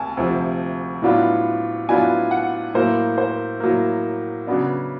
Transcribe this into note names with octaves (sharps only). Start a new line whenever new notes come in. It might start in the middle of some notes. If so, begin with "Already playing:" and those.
Already playing: D2 C3 G#5 A5
D2 C3 F3
A2 F#3 B3 D4 F4
A2 F#3 B3 D4 F4 G#5
F#5
A2 F#3 A#3 C5
C5
A2 F#3 A#3
C#3 F#3 B3 D4